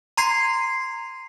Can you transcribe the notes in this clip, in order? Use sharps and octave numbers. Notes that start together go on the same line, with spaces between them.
A#5 C6 G#6 C7